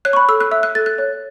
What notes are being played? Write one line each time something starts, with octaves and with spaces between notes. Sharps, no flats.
C#5 F#6
C#6
B5
A4 E6
F#6
E5 E6
F#6
A4 A6
F#6
C#5